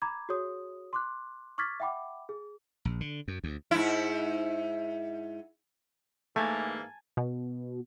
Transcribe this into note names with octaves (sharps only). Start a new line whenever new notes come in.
A#5 B5 D6 G#6
F#4 G#4 C#5 D#6
C6 D6 F#6
C#6 D6 F6 G#6 A6 B6
E5 F#5 G5 B5 D6
G#4
A#1
D3
F#2
D2
G#2 E4
G#2 E3 A3 A#3 G#5 A5
B2